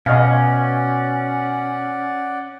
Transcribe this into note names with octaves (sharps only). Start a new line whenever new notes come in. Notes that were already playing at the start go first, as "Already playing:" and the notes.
B2 C#4 D5 D#5 F5 F#5